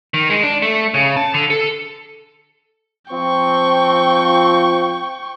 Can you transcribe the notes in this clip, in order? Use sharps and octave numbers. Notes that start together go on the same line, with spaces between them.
D#3
G#3
D4
A3
C#3
A5
D3
A4
F3 C4 G5 C#6